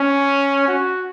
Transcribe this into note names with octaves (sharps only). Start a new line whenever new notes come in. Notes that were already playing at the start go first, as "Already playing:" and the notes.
Already playing: C#4
F#4